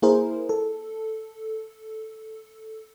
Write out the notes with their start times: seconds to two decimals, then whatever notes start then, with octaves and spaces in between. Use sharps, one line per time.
0.02 A#3 E4 G#4 A#4 C5
0.49 A4